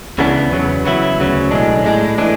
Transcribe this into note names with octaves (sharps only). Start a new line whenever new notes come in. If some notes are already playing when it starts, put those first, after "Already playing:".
C#2 C#3 E3 B3 D4
E2 C#3 F#3
C#3 F#3 B3 E4
D2 C#3 F#3
B1 A2 G#3 D4
A2 G#3 D4
A2 E3 G#3 D4